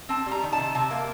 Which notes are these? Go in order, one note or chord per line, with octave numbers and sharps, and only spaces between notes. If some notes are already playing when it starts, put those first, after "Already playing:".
C4 A5
G3
A#5
D#3
A5
C3
C3 A5
A#3